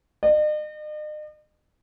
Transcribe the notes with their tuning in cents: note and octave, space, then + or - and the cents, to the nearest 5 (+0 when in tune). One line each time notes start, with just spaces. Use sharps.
D#5 -45